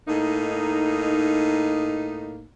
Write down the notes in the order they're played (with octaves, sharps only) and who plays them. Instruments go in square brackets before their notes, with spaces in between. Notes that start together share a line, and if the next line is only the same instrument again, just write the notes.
[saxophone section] A2 A#3 D#4